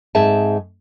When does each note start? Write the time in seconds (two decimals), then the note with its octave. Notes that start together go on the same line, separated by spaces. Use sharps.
0.15 G#2 C4 G#4 E5 A5